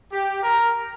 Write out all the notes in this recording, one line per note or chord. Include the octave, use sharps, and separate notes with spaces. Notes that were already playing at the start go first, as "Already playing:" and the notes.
G4
A#4